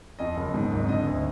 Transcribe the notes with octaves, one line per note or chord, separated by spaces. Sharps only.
F2 D#5
F#1
G#2
G#1
D3 D#5
D2